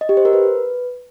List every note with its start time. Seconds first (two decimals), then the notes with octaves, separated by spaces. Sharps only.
0.01 D#5
0.09 G4
0.17 C5
0.25 A#4
0.33 B4